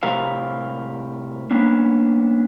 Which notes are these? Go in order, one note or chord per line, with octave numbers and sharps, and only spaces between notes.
A2 C3 G4 A#4 F5
A#3 B3 C#4 D4